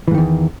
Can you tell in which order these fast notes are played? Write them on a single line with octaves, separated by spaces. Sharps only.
E3 G#2 D#3 E2